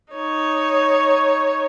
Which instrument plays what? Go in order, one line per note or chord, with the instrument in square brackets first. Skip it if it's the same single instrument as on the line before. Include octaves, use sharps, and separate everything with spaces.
[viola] D#4 C#5